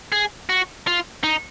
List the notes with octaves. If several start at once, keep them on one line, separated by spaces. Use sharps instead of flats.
G#4
F#4
F4
D#4